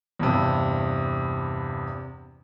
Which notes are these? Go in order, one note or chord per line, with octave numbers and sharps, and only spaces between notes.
E2 G2 C3